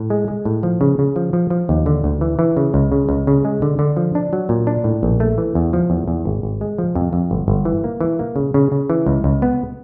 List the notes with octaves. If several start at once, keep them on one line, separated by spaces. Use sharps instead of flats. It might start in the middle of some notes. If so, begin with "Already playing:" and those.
Already playing: A2
G#3
G#3
A2
F3
C#3
C#3
F3
F3
F3
D#2
D3
D2
E3
E3
C#3
C#2
C#3
C#2
C#3
G#3
D3
D3
F3
D4
F#3
A#2
D4
A2
A#1
A3
E3
E2
F3
E2
E2
G#1
G#1
G#3
F3
F2
F2
G1
G1
E3
A#3
E3
A#3
C#3
C#3
C#3
E3
C#2
C#2
B3